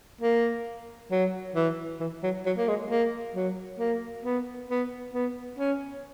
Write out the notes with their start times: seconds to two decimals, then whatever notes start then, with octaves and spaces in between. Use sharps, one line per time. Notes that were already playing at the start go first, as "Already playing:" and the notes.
0.21 A#3
1.11 F#3
1.55 E3
2.00 E3
2.23 F#3
2.46 F#3
2.57 A#3
2.68 G#3
2.90 A#3
3.36 F#3
3.79 A#3
4.25 B3
4.70 B3
5.14 B3
5.59 C#4